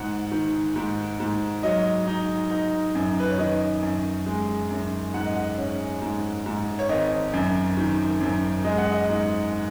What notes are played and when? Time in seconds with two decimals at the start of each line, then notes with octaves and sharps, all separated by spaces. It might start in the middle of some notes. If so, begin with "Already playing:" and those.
Already playing: G#2 F#5
0.32 D#3
0.76 G#2
1.20 G#2
1.63 F#3 D#5
2.07 D#4
2.51 D#4
2.95 F#2
3.20 B4
3.29 C#5
3.38 D#3 D#5
3.83 F#2
4.26 G#3
4.70 F#2
5.14 G#2 F#5
5.25 D#5
5.36 F#5
5.58 C#4
6.02 G#2
6.46 G#2
6.79 C#5
6.89 G#1 D#5
7.33 F#2
7.77 D#3
8.21 F#2
8.64 G#3 D#5
8.78 F#5
8.92 D#5
9.09 G#2